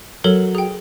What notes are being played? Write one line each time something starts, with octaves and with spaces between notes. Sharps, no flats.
F#3 A4 A#4 C#5
G#4 G5